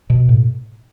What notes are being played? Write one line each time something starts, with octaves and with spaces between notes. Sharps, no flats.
B2
A2